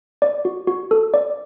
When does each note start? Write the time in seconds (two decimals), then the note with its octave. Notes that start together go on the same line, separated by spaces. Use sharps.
0.22 D5
0.45 F#4
0.67 F#4
0.91 A4
1.14 D5